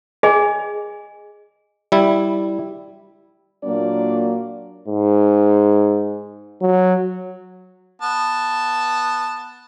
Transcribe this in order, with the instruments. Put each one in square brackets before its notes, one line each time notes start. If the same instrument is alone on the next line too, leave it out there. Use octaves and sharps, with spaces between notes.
[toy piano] G#4 D#5 G#5
[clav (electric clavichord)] G3 E4
[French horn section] A#2 F#3 A#3 D4 D5
[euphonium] G#2
F#3
[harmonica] B3 A5